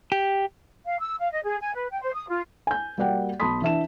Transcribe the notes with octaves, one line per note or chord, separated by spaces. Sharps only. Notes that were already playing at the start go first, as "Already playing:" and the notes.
G4
F5
E6
F5
D#5
G#4
G#5
B4
G5
C5
D#6
F4
G#5 G6
G3 A#3 F#4 D5 F#5 G5
B1 A5 B5 C6 D#6 B6
E3 D4 E5 A5 E7